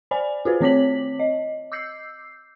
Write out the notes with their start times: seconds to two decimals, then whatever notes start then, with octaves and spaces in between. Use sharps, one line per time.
0.11 C5 D5 G#5 B5
0.45 F4 F#4 G#4 B4 C5
0.61 D#3 C4 C#5 D6 B6 F#7
1.19 D#5
1.72 D6 E6 G6 C7